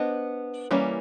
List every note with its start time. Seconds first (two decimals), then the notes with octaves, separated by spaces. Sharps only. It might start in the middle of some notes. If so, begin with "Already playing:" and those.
Already playing: B3 D4 C5 D#5
0.71 E3 G3 A#3 C#4